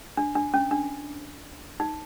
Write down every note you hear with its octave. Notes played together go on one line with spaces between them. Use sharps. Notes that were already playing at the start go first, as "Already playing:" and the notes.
D4
D4
C#4
D4
D#4